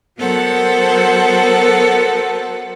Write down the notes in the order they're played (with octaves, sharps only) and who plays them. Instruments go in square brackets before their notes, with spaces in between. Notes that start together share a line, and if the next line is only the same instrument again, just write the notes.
[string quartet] F#3 B3 A4 A#4 C5 F#5